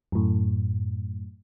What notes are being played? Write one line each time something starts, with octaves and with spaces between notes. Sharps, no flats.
F#2 A2